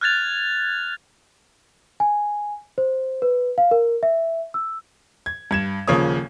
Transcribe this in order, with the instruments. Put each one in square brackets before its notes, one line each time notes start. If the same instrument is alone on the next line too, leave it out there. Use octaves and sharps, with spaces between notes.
[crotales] F6 F#6 G#6 A6 F7
[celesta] G#5
C5
B4
F5
A#4
E5
E6
[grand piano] G#6
G2 G#6 E7
D#1 C#3 F3 A#3 C#5 D#6